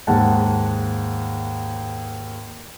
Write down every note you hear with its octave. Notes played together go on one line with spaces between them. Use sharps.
D#2 G#2 F#5 A5